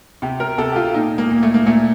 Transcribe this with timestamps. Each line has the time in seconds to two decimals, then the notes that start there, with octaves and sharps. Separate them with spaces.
0.22 C3 G4
0.40 A#4
0.58 C3 A4
0.72 G4
0.76 F4
0.94 A#2 D#4
1.18 A#3
1.30 A#2
1.43 A3
1.54 A#3
1.66 A#2 A3